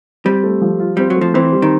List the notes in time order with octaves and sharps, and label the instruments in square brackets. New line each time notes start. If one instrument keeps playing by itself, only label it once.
[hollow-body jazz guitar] G3 [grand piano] C4
[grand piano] A3
F3
F4
[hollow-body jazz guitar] G3 [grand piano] C4
[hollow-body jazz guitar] F#3
[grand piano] A3
[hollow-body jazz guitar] F3
[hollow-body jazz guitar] E3 [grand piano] C4
[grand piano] G3
[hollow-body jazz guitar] D#3